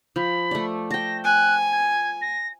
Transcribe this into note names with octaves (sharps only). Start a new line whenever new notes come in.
F3 B5
A3 D5
G5 A5 A#6
G#5 F#6
G#6
A#6